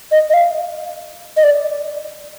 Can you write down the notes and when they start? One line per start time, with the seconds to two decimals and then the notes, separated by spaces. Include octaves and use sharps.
0.12 D#5
0.30 D#5
0.34 F5
1.37 D#5
1.43 D5